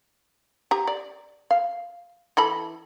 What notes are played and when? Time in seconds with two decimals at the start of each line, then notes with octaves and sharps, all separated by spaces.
0.71 G4 A#5
0.87 D5
1.51 F5
2.37 E3 A4 B5